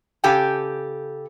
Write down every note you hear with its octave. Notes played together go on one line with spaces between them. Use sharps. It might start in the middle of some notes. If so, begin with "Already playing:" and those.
C#3 G4 A4 G5 G#5